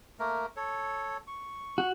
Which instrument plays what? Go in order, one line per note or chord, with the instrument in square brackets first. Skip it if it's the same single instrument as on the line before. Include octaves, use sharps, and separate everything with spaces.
[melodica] A3 A#3 A#4
A4 C#5
C#6
[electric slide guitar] F#4